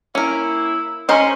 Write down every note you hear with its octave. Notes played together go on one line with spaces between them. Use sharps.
A#3 C#4 E4 A#4
G#3 C#4 A#4 C5 D#5